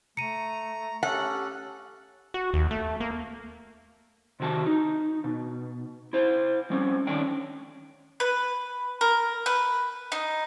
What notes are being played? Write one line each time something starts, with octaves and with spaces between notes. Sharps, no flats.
A3 A#5 C#7 D#7
C#4 G4 A4 F#5
F#4
D#2
A3
A#3
C3 D#3 F#4 G#5 A5
D#4
B2
E4 C5
G3 C4 C#4
D3 D#3 C#4 D4 G5
B4
A#4
B4
D#4